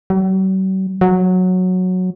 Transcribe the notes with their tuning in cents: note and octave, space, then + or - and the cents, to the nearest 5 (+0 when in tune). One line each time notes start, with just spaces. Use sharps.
F#3 +45
F#3 -10